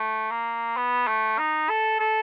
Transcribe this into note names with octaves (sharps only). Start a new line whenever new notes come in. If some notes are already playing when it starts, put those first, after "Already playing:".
Already playing: A3
A#3
B3
A3
D#4
A4
A4